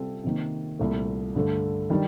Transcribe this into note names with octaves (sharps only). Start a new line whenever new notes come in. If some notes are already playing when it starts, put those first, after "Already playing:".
Already playing: C3 G3 C4 F4 A4
C3 D#3 A#3
C2 A#2 A3
G2 D3 A3
D#3 G3 D4